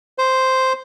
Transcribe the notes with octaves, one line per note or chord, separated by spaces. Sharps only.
C5